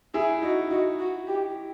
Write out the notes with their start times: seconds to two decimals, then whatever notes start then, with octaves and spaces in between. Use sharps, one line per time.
0.14 E4 G#4
0.42 D#4 F#4
0.70 D#4 F#4
0.99 F#4
1.28 G4